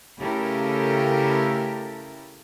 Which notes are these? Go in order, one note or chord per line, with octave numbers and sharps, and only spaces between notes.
C#3 A3 E4 G4 A4 A#4